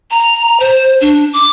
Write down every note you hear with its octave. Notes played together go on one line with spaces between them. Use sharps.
A#5
C5
D4
D6